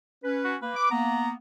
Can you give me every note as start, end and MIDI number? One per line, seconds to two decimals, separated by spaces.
0.24 0.56 61
0.24 0.56 71
0.44 0.57 66
0.62 0.73 58
0.62 0.86 71
0.76 0.89 86
0.91 1.34 58
0.91 1.34 59
0.91 1.30 82